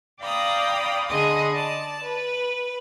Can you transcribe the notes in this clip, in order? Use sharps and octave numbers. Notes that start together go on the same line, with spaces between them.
D5 F5 G5 A#5 B5 D#6
D3 G#4 D#5 B5 C6 D#6
D5 A5
B4